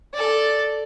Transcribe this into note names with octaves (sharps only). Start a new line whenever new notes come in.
A4 D5